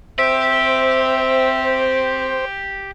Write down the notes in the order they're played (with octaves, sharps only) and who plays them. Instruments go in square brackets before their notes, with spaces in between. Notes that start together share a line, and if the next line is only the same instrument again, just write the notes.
[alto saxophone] C4 [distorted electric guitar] G4 [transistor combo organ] C5 [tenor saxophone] E5